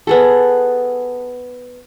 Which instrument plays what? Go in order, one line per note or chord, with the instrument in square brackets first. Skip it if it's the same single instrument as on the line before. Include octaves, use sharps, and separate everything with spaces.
[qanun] B3 G#4 A4